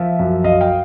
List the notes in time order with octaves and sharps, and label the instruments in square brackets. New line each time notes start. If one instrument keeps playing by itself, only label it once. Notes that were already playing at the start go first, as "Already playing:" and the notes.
Already playing: [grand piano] F3 E5
F#2
F#2 D#5 F5
F5 G5